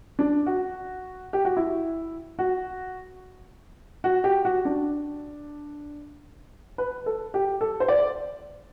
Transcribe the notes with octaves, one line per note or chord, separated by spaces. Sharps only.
D4
F#4
G4
F#4
E4
F#4
F#4
G4
F#4
D4
B4
A4
G4
A4
C5
D5